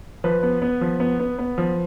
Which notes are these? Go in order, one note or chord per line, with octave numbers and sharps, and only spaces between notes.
F3 B4
B3
B3
F3
B3
B3
B3
F3